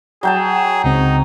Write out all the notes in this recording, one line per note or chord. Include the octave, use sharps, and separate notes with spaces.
F#3 G#4 G5 A5
C#2 C#3 C4 D#4